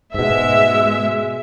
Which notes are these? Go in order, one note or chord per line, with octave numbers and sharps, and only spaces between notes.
G#2 B2 G#3 E5